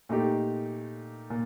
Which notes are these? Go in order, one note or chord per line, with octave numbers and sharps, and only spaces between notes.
A#2 A3 D#4 G4
A#2